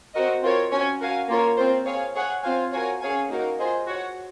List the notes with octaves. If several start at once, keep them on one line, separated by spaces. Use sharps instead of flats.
C4 F#4 A#4 D#5
C4 F4 A#4 C#5
C#4 F#4 C#5 G#5
F#4 A#4 F5 G#5
A#3 F4 A#4 C#5
C4 F4 C5
G#4 C#5 F5
G#4 C#5 F#5
C4 F4 C5 F5 G#5
F#4 A#4 C#5 F5 G#5
C#4 G#4 C#5 F5 G#5
A#3 D#4 F#4 A#4 F5
F4 G#4 C5 D#5
F#4 C#5 F#5